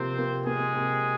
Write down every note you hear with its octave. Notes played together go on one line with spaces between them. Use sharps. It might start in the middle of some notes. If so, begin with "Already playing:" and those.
Already playing: C3 F3 A#3 C4 C5
A#3
G#3 A#3 G#4
C3